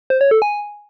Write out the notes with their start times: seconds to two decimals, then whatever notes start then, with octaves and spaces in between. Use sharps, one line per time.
0.10 C5
0.21 C#5
0.31 A4
0.42 G#5